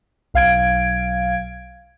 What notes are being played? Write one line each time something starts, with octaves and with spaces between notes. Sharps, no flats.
B1 F5 G#6 D7